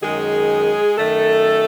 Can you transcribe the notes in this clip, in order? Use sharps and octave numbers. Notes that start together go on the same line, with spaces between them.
F#2 D#3 G#3 G#4
F#2 D#3 A3 A4